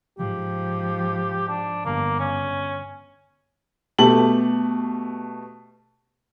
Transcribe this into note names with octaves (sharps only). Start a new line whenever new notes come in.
G#2 F3 G4
D4
G1 D3 A#3
C#4
B2 A3 G4 A5 F#7